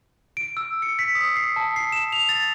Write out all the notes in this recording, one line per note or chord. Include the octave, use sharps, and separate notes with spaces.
D7
E6
C#7
B6
D#6
C7
A5
C7
E7
F7
A6